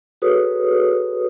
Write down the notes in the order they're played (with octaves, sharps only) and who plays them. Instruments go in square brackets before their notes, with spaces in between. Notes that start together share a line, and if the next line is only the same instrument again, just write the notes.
[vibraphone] F#4 G#4 A4 B4 C#5 D#6